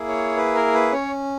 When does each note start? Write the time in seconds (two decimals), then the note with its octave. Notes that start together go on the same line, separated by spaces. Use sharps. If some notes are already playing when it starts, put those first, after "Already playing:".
Already playing: A#3 E4 G#4
0.08 C#5
0.37 B4
0.55 A#4
0.74 B4
0.92 C#4 C#5